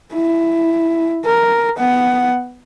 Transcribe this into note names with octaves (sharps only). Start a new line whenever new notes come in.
E4
A#4
B3 F#5